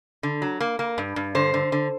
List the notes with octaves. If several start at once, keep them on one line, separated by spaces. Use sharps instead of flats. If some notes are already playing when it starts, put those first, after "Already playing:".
D3
F#3
A#3
A#3
G2
G2
D3 C5
D3
D3